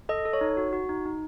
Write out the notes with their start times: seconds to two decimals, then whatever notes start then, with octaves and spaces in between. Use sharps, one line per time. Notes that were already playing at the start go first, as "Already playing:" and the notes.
0.09 A4 D#5
0.25 A4
0.33 C#5
0.41 D#4
0.57 F#4
0.73 F#4
0.89 D#4
1.05 D#4